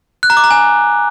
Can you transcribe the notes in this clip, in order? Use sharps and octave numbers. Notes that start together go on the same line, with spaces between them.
F#6
A#5
D6
A#5
G#5